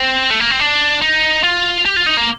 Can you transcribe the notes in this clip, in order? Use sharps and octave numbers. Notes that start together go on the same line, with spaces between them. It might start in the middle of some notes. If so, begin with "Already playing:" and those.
Already playing: C4
A3
A#3
C4
D4
D#4
F4
G4
F4
D#4
A#3